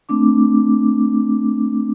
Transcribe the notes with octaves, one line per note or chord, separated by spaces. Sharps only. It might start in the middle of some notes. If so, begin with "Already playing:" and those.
A3 C4 D4 D6